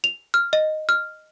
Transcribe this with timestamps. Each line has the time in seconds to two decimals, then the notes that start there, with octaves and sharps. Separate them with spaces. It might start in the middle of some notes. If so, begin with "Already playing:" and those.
0.04 F7
0.34 F6
0.53 D#5
0.89 F6